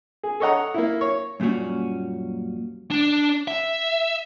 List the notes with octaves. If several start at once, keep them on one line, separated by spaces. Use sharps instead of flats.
G#4
A4 C#5 D#5 F#5 A#5
A#3 E4
C#5
F#2 A#2 G3 C#4 F#4
D4
E5